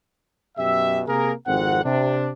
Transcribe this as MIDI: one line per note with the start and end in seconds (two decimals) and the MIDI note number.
0.58 1.02 42
0.58 1.02 47
0.58 1.02 67
0.58 1.02 76
1.07 1.32 48
1.07 1.32 58
1.07 1.32 68
1.07 1.32 70
1.47 1.84 32
1.47 1.84 41
1.47 1.84 60
1.47 1.84 78
1.84 2.30 48
1.84 2.30 62